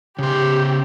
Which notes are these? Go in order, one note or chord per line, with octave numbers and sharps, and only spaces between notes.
C#3 G4 C5